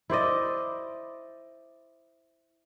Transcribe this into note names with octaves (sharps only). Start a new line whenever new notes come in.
E4 C5 D5 D#5